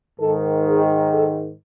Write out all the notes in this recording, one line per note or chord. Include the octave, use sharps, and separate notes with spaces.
G#2 D#3 A4
G#4
A4